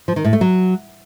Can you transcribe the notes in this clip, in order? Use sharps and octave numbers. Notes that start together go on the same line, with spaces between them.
F3
D#3
A2
A3
F#3